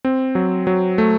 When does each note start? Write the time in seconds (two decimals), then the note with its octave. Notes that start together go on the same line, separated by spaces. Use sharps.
0.05 C4
0.35 F#3
0.67 F#3
0.98 A3